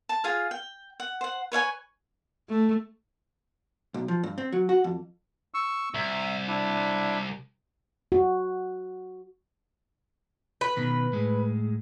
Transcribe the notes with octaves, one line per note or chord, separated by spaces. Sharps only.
A5
F4 G#4 F5
G5
F#5
C5 F#5
B4 C#5 F5 G#5
A3
B1
F3
G2
C4
F#3
F#4
F2
C#6 E6
C2 E5
D4 E4
F#4
B4
B2 D#3
A2 G#3